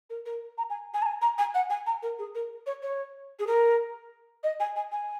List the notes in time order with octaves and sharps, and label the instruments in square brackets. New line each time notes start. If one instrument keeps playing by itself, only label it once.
[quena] A#4
A#4
A#5
G#5
G#5
A#5
G#5
A#5
G#5
F#5
G#5
A#5
A#4
G#4
A#4
C#5
C#5
G#4
A#4
D#5
G#5
G#5
G#5